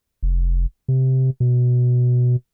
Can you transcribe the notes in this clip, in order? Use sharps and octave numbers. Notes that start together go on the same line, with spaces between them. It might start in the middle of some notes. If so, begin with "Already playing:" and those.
F1
C3
B2